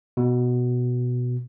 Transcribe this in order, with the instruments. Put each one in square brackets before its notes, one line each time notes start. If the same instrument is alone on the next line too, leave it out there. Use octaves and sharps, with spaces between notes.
[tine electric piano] B2